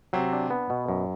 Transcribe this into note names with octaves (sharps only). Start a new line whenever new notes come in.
C3 F#3 C4
D4
B3
B2
F#2